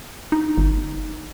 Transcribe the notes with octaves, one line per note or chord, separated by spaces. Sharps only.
D#4
G1